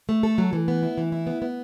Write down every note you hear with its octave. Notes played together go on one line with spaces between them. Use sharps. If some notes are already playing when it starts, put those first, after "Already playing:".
A3
A4
F#3
E3
B3
E4
E3
E4
B3
B3